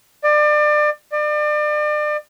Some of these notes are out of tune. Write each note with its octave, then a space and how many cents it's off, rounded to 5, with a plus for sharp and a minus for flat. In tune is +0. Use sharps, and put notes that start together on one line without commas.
D5 +30
D5 +35